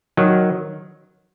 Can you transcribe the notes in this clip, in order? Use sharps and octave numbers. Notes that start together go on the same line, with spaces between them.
D#3 F#3